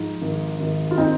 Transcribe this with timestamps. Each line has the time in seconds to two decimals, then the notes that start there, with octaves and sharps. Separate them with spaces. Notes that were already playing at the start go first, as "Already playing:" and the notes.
Already playing: G#2 F3
0.22 G#1
0.60 G#1
0.91 F4
0.97 C4 D#4